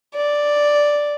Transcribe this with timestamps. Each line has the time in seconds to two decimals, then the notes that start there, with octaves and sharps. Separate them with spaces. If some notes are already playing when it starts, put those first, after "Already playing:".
0.15 D5